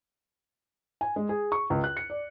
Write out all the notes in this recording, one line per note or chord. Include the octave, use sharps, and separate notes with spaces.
G#5
G#3
G#4
C#6
C#2
F#6
C#7
D5